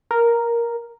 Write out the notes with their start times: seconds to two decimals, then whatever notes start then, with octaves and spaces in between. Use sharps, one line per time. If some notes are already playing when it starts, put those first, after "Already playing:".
0.11 A#4